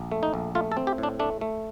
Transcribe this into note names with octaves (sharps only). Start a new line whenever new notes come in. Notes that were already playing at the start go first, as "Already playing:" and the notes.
Already playing: A#1
A3
D#4
A#1
A3 F4
A4
C4
G4
A2
D4
A3 D4
A3